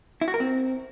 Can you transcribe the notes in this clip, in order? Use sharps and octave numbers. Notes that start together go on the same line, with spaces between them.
E4
F#4
A#4
C4